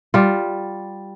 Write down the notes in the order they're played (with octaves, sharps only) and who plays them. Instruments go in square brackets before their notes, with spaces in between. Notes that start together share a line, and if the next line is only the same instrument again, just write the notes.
[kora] G3 F4